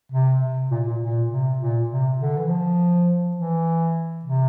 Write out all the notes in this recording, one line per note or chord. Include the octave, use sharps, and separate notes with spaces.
C3
C3
A#2
A#2
A#2
C3
A#2
C3
D3
E3
F3
E3
C3